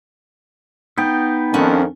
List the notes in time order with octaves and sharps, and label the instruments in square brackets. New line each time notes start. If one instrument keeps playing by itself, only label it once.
[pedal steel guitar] B3 G5 [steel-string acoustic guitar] D#4
[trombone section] F2 D#3 [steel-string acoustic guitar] C#4 D4 F#5